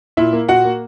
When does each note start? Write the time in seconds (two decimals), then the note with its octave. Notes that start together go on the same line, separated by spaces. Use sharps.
0.17 A#2 E4 E5
0.33 A#3
0.48 A#2 F#4 F#5
0.64 A#3